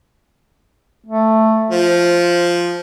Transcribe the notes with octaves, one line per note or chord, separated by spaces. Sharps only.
A3
F3 C5